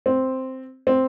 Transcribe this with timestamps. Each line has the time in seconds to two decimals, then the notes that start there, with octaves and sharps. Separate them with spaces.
0.06 C4
0.87 C4